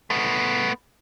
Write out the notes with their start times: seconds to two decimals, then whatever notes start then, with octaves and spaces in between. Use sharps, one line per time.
0.10 A3 B3